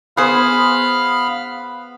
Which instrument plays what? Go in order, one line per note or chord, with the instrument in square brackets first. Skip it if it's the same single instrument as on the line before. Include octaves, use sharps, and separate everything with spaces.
[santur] B3 [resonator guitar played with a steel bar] G#4 C5 [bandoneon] F5 B5 F6